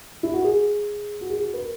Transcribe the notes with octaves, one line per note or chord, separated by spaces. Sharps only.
E4
F#4
G#4
F#4
G#4
F#4
B4
A#4